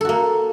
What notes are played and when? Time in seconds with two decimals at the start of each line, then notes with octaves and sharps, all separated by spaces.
0.01 A4
0.05 F#4
0.09 A#3